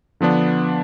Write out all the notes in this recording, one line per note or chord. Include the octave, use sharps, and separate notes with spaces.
D3 F3 B3 D4